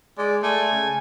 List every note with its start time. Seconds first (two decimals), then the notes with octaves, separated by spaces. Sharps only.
0.18 G#3 D5
0.43 A3 G#5
0.72 C#3